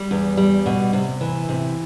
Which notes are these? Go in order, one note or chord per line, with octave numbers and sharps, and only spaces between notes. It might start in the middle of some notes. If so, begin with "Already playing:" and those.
Already playing: G3
E2
G3
B2
C3
E3
C3